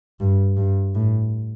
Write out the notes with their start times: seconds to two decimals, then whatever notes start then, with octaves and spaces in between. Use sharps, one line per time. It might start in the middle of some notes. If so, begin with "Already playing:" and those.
0.20 G2
0.57 G2
0.95 A2